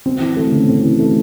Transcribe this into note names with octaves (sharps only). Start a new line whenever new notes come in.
C4
E3
A3
C#3
C4
E3
A3